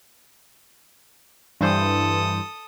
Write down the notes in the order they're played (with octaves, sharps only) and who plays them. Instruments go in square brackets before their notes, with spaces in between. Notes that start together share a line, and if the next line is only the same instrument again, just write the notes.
[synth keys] G2 E3 C5 [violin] A4 D#6